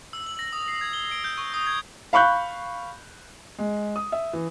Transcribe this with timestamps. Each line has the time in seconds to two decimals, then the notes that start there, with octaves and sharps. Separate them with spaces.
0.13 E6
0.27 F#7
0.39 A#6
0.53 D#6
0.68 C7
0.81 G#6
0.93 G7
1.11 D7
1.24 G6
1.38 C#6
1.54 D#6
1.67 G#6
2.13 F5 B5 C#6 F#6 G6
3.59 G#3
3.96 D#6
4.12 E5
4.33 E3